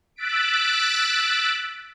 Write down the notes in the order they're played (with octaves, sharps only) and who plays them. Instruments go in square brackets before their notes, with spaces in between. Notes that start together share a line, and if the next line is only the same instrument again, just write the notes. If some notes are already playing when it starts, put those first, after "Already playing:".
[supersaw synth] E6 F#6 A6 B6 D7